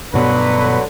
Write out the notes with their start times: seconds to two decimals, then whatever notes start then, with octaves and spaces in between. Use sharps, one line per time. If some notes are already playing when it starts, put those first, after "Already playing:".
0.14 G2 B2 D3 F#3 B3 B4